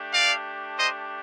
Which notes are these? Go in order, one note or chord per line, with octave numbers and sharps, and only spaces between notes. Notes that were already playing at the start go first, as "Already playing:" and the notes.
Already playing: A3 D4 G4
D5 F5
C5 D#5